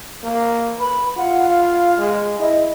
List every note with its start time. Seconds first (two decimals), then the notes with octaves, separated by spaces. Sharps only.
0.23 A#3
0.79 B4 B5
1.17 F4 F#5
1.50 F5
1.98 G#3
2.39 E4 D#5